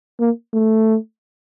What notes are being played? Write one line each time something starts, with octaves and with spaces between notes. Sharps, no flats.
A#3
A3